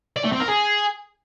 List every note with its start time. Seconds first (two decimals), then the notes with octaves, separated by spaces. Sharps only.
0.16 D5
0.24 A3
0.32 C4
0.40 A#4
0.48 G#4